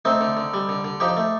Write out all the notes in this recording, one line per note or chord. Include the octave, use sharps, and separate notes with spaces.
A3 C4 D#4
D3
D3
G3
D3
D3
F3 D#4 G4
A3